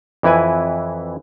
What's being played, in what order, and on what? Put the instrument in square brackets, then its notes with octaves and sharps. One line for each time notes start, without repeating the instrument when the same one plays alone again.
[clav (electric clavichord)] F2 E3 E4 B4 G#5